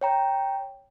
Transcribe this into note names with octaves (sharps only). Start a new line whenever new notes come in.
C#5 G5 A#5